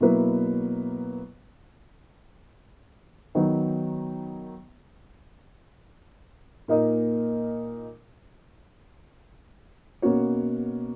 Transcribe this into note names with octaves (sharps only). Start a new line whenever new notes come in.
B2 F#3 A#3 E4 B4
D#3 F#3 B3 D#4
A#2 A#3 D#4 A#4 D#5
B2 A#3 C#4 F#4 C#5